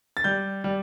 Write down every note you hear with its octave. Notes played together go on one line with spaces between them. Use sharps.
A6
G3 G6
G3